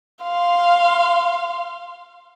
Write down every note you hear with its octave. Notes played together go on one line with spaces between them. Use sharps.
F5 C6